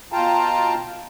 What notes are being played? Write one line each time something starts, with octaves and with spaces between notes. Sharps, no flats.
B2 F4 F5 G5 A5 A#5